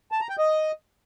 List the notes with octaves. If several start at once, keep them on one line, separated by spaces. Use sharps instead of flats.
A5
A#5
G5
D#5